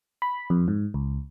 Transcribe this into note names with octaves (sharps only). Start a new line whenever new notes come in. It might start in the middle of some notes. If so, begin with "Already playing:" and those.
B5
F2
G#2
C#2